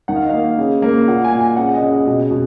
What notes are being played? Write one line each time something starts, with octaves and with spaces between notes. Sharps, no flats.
D#3 F#5
F5
D#5
A#3 F5
C#3
A#3
A#2 F#5
G#5
A#2
G#5
C#3 F#5
D#5
C#3
D#5
B2 D#5
B2